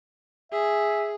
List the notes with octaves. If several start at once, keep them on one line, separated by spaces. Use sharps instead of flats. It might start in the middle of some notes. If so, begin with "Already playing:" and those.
G#4 E5